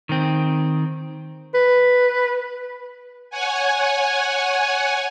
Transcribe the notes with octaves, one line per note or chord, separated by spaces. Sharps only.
D#3 C4
B4
C#5 F#5 G#5